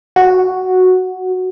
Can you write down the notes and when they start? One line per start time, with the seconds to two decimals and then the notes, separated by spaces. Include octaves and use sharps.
0.16 F#4